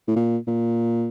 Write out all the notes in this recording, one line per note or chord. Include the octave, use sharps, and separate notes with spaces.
A2
A#2
A#2